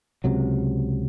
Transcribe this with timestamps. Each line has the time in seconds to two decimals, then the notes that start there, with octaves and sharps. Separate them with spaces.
0.24 C#2 C3 F#3